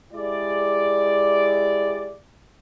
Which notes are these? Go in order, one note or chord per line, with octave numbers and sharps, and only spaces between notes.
G#3 E4 G4 G#4 D5